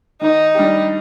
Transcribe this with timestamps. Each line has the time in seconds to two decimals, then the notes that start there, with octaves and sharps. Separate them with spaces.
0.21 D#3 D#4
0.55 G3 D4 G4